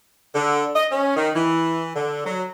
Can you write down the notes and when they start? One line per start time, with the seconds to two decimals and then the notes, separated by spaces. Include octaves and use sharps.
0.35 D3
0.76 D#5
0.92 C#4
1.17 D#3
1.36 E3
1.96 D3
2.26 F#3